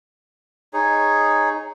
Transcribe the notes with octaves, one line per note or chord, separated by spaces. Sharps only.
D#4 G#4 C#5